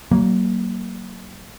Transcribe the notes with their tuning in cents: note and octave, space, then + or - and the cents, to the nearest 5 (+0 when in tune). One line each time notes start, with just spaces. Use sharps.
F#3 +35 A#3 +0